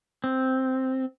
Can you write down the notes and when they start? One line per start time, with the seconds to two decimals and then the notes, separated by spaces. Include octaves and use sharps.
0.24 C4